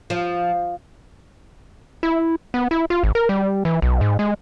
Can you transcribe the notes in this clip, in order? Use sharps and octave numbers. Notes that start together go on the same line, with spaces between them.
F3
E4
B3
E4
F4
G#1
A#4
G3
E3
B1
G#2
G#3